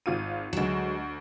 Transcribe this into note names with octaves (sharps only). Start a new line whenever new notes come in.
G#1 F4 D#7
D2 F#3 G#3 E7